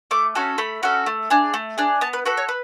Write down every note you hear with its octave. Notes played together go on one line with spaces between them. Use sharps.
A3 D6
C#4 F#4 A4
A3 B5
C#4 F#4 A4
A3
D4 G#4
A3
D4 G#4
B3 A5
B4
F#4 A4 B4
C#5
B4